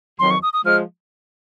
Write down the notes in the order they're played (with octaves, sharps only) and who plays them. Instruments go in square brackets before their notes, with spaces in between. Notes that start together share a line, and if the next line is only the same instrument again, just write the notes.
[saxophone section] F2 D#3 F#3 [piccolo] C6
[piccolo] C#6
D#6
D#6
[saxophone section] F3 G#3 [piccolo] F6